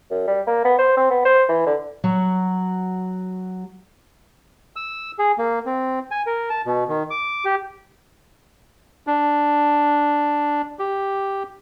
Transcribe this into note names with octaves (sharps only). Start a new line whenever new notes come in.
F#2
G3
A#3
B3
C5
C4
B3
C5
E3
D3
F#3 F#4
E6
G#4
A#3
C4
G#5
A#4
A5
B2
D#3
D6
G4
D4
G4